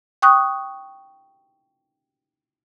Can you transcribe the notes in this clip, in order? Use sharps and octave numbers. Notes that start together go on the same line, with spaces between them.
G5 C#6 D#6 F#6